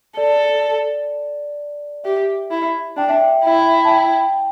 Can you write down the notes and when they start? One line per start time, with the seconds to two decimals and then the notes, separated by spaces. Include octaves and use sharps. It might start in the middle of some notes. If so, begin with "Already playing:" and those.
0.17 A4 D5
2.04 G4 E5
2.51 E4
2.97 D4 G5
3.09 E5
3.21 G5
3.44 E4
3.85 A5
3.91 G5